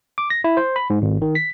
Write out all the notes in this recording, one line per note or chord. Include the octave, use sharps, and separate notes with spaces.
D6
A#6
E4
C5
B5
G#2
G#1
D#3
B6